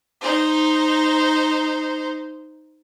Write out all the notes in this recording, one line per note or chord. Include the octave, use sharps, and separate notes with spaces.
D#4 C5